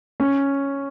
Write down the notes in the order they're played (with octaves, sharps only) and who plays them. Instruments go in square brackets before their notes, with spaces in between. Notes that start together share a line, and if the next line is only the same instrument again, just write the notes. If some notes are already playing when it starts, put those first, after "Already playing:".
[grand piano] C#4